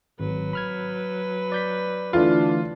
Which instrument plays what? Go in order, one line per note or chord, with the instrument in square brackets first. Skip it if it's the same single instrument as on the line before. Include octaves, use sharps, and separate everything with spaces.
[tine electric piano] G#1 [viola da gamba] F#3 B4
[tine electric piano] B5 F6 G#6
D5 G6 B6
[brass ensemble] D3 D4 [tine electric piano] E3 A3 [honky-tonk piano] F4